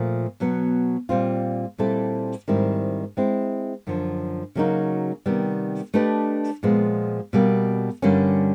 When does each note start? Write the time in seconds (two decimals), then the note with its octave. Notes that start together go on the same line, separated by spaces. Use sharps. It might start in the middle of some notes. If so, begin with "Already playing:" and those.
Already playing: A#2 F3 A3
0.40 B2 F#3 B3
1.09 A#2 G3 C4 F4
1.78 A#2 G3 C4 E4 A4
2.48 G#2 D#3 G3 C4 E4
3.17 G#3 C4 E4
3.87 F#2 D3 F3
4.55 C#3 F#3 A#3 D#4 F#4
5.26 C3 D#3 G3 B3
5.94 A3 D4 G4 B4 D#5
6.63 A#2 F3 G#3 B3
7.33 B2 G3 A#3
8.02 G2 D3 G3 A#3 C#4